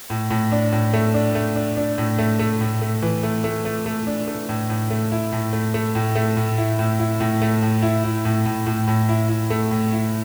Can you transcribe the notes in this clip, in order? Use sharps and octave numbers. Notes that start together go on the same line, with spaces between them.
A2
A2
D4
A2
A3
D4
A3
D4
D4
A2
A3
A3
A2
A3
E3
A3
A3
A3
A3
D4
A3
A2
A2
A3
E4
A2
A3
A3
A2
A3
A2
E4
A2
E4
A2
A3
A2
E4
E4
A2
A2
A2
A2
E4
E4
A3
A2
E4